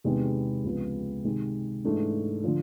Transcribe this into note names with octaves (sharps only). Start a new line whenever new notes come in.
E2 C3 D#3 G#3 B3
C#2 C3 F3 G#3 B3
C3 D#3 G#3
G#2 E3 A3 D4
D3 F3